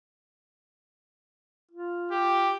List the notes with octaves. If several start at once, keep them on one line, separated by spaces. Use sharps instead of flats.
F4
G4